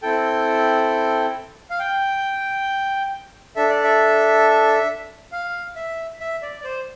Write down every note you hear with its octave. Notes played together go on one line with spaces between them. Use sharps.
C4 E4 A4 G5
F5
G5
D4 A4 E5
D5
E5
F5
E5
E5
D5
D5
C5